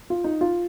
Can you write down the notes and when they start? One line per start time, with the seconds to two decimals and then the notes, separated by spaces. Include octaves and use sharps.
0.10 F4
0.24 D#4
0.41 F4